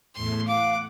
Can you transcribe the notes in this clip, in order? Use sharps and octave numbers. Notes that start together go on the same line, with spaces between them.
E2 A2 A3 C6
F5 F#5 D6